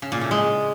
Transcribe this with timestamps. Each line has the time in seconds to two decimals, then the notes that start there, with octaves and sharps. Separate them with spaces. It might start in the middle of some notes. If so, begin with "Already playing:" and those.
0.02 C#3
0.12 A#2
0.21 A2
0.31 G#3